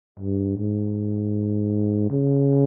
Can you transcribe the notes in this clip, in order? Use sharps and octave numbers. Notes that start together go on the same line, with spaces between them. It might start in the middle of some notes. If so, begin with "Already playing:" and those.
G2
G#2
C#3